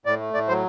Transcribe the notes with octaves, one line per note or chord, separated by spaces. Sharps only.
A2 D5
A3
A2 D5
F#3 C5